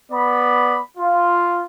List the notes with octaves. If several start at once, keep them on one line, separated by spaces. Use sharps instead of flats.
B3 D5 B5
F4